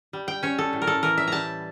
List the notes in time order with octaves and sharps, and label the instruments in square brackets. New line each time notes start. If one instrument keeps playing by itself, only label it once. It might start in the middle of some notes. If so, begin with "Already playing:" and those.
[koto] G3
G5
C#4 C#5
A4
A2
A#4
A4
E3 A#4
E5
G3 A5 A#5